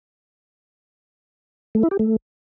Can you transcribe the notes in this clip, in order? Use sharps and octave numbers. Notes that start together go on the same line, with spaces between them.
A3
E4
G4
A3